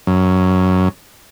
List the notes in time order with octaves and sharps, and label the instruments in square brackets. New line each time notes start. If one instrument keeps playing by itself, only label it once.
[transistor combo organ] F#2